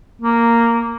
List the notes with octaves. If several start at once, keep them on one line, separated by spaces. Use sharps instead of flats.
A#3